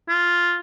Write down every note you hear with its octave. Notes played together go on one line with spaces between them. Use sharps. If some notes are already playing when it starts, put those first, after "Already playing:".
F4